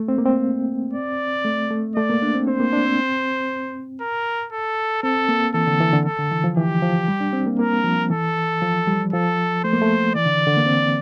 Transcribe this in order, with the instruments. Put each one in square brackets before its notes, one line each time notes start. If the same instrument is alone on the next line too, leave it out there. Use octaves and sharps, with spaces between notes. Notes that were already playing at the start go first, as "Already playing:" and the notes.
Already playing: [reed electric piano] A3
C4
A#3
C4
[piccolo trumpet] D5
[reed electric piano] A3
A3
[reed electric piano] A3 [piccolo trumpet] D5
[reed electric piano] A#3
D4
C4
[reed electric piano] C4 [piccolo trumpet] C5
[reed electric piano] A#3
D4
C4
[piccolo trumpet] A#4
A4
[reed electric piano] C4 [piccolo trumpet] A4
[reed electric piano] A#3
[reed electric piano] E3 [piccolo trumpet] A4
[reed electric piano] D3
E3
D3
[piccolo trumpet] A4
[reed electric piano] D3
E3
F3
[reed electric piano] E3 [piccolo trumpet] G4
[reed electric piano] F3
G3
D4
C4
A#3
[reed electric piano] A#3 [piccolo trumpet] A#4
[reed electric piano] F3
[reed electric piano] E3 [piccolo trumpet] A4
[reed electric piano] F3
G3
[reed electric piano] F3 [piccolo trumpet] A4
[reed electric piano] A3 [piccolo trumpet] C5
[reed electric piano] A#3
A3
[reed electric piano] E3 [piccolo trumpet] D5
[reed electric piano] D3
D3
A#3
C4